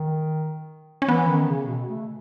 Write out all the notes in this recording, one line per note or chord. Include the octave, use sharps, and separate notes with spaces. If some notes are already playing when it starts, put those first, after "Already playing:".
Already playing: D#3
C#4
E3 B3
D#3
C#3
B2
A3